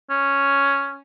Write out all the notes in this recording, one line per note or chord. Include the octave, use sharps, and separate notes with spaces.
C#4